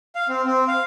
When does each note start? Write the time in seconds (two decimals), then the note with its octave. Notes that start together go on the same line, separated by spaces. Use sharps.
0.15 F5
0.29 C4
0.46 C4
0.68 F5